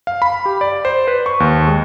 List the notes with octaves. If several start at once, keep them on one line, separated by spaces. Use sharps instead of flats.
F5
B5
G4
D5
C5
B4
C#6
D#2
G#3